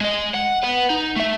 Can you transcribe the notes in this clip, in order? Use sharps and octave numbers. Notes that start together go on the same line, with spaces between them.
G#3 D#5
F#5
B4 F#5
D#4
A3 E5